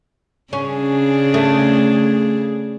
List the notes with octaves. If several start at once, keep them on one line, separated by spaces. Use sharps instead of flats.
C#3 C#4 D4 G#4
A3